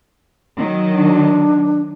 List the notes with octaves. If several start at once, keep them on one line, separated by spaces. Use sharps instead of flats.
D#3 F#3
D4